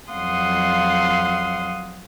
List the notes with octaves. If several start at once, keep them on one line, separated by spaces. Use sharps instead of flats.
F2 F#3 F5 F#5 C6 D#6